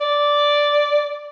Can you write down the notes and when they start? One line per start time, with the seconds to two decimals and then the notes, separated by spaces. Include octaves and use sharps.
0.01 D5